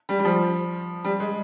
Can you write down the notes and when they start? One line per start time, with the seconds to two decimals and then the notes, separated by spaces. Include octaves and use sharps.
0.09 G3
0.20 G3
0.25 F3
1.05 G3
1.20 G#3